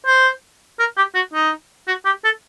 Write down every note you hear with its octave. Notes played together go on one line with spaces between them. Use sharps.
C5
A#4
G4
F#4
D#4
F#4
G4
A4